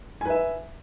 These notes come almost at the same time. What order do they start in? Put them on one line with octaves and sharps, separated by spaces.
G#5 B4 E5